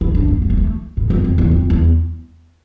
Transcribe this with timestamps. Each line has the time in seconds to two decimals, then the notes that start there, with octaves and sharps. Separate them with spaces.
0.01 E4
0.15 D4
0.28 A#3
0.42 A3
0.50 A#3
0.57 A3
0.97 A2
1.10 F2
1.24 F2
1.38 E2
1.51 F2
1.70 E2